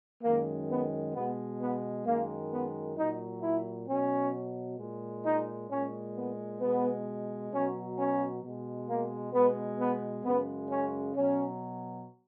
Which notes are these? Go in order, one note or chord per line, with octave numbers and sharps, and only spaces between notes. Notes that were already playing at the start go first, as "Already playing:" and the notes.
F#2 D#3 G#3 A#3
B3
B2 G#3 B3
B3
F#2 D#3 G#3 A#3
B3
A#2 F#3 D#4
E4
B2 F#3 C#4
A#2 G#3
D#4
A#2 G#3 C#4
B3
B2 G#3 B3
B2 F#3 C#4
C#4
B2 G#3
A#3
B2 G#3 B3
B3
F#2 C#3 G#3 B3
C#4
B2 F#3 C#4